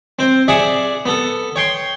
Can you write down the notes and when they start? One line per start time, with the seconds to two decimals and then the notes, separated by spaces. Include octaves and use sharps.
0.19 C4 C5
0.48 G#4 D5 E5 F#5
1.05 B3 A4
1.56 C#5 G5 C6